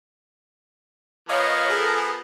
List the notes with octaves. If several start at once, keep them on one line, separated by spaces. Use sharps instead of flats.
F3 B3 A#4 C#5 D#5 F5
G#4 A4